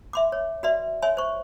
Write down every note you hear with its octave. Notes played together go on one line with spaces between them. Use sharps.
E5 C6 D6
C#5
F#4 B4 D5 E5 C6
C#5 E5 G#5 C6
C5 C#6